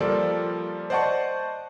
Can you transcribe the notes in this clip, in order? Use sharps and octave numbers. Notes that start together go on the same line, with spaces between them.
F3 G3 A#3 F4 A4 D5
C5 D5 D#5 F#5 A5 C#6